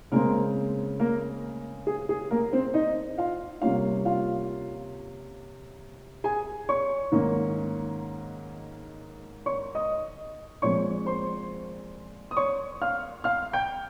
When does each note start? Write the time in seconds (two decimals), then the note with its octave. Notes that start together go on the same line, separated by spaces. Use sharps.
0.12 C#3 G#3 A#3 C4 A#4
1.00 A#3 A#4
1.87 G#4
2.09 G#4
2.31 A#3 A#4
2.53 C4 C5
2.74 D#4 D#5
3.18 F4 F5
3.62 C3 G3 A#3 C#4 F4 F5
4.05 F4 F5
6.24 G#4 G#5
6.69 C#5 C#6
7.12 G#2 D#3 A#3 C#4
9.46 C#5 C#6
9.75 D#5 D#6
10.62 A#2 F3 G#3 C4 C#5 C#6
11.06 C5 C6
12.31 D#6
12.37 C#5 C#6
12.82 F5 F6
13.24 F5 F6
13.53 G5 G6